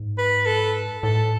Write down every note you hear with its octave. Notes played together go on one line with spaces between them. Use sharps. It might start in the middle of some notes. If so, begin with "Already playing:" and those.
Already playing: G#2
B4
A4
A2 A4